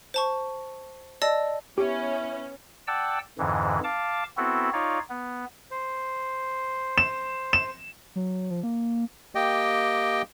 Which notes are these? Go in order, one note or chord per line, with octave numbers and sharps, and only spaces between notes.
C5 A5 C#6
D5 D#5 A5 E6
B3 C#4 E4 G4
D5 F#5 G5 A5 E6
F2 G#2 D3 E3
F5 A5 D6
B3 C4 E4 F#4 A4
D#4 F4 C#5 D5 F5
B3
C5
E7
E7
F#3
F3
A#3
A#3 G4 D#5 G5